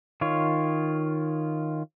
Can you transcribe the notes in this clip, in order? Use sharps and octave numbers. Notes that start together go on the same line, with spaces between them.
D#3 F4 C#5